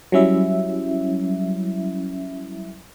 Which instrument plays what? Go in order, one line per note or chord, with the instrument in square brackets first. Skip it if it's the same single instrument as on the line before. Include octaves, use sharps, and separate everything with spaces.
[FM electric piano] F#3 G3 C#4 E4 E5